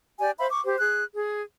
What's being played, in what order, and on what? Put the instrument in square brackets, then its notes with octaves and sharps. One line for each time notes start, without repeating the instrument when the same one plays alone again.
[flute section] G4 D5 G#5
C5 E5 F5 B5
C#6 D6
G4 C5
G#4 F#6
G#4